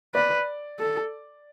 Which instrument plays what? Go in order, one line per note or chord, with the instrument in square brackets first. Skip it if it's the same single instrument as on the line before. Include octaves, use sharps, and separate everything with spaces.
[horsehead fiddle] B4 [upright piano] D5
[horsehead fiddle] A4